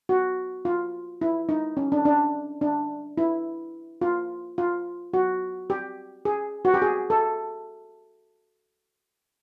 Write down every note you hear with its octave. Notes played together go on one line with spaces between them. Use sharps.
F#4
F4
E4
D#4
C#4
D4
D4
D4
E4
F4
F4
F#4
G4
G#4
F#4
G4
G#4
A4